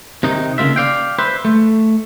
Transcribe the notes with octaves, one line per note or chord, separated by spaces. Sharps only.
C3 D#3 D#4
C#3 A#3 F4 E5
D5 F5 G5
B4 C5 E5
A3